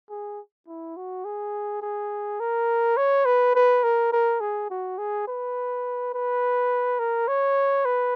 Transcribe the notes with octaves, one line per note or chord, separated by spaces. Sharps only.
G#4
E4
F#4
G#4
G#4
A#4
C#5
B4
B4
A#4
A#4
G#4
F#4
G#4
B4
B4
A#4
C#5
B4